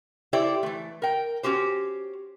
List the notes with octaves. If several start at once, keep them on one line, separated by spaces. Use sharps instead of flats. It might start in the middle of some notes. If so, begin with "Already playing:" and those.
E4 G4 A4 C5 D5
E3 A3
A#4 G5
C#4 F#4 G4 C5